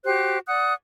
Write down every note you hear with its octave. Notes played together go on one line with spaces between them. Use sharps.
F#4 G4 C5 F#6
D5 F#5 D#6 F#6